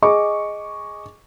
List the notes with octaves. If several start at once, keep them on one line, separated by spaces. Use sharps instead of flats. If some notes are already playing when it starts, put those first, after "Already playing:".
G#4 D#5 C#6 D6